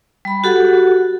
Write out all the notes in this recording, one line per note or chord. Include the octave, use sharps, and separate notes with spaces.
G3 B5
F#4 G4 A4 F#5